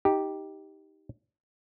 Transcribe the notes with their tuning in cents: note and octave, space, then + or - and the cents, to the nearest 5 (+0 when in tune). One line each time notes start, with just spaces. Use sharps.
D#4 +10 G4 +0